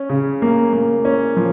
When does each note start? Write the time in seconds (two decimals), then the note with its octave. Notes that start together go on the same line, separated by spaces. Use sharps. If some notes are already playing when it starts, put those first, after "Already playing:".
Already playing: C#4
0.09 C#3
0.42 A#3
0.73 A#3
1.05 C#4
1.36 F3